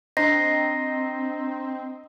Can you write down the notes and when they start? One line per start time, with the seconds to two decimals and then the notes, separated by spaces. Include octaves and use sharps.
0.17 C4 D4 D#5 A#5 A#6 C7